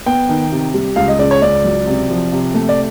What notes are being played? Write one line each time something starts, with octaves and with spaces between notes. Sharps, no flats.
B3 G5
D#3
C3
G3
C#2 F5
D#5
C#3 D5
C#5
C#2 D5
F#3
C3
F3
C3
A3
D5